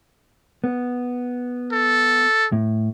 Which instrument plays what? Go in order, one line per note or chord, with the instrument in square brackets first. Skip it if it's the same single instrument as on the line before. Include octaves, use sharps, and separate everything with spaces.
[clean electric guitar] B3
[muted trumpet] A4
[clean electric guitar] A2